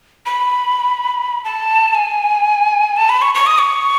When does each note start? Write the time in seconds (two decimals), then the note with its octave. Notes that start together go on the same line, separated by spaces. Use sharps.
0.26 B5
1.44 A5
1.94 G#5
2.96 A5
3.09 B5
3.22 C#6
3.35 C#6
3.46 D#6
3.58 C#6